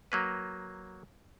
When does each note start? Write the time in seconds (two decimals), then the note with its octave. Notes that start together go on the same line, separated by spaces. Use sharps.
0.12 F#3 A#3 B4